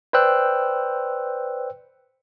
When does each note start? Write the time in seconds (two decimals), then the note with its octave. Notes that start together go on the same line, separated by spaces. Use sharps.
0.13 B4 C5 D5 G5 E6 F#6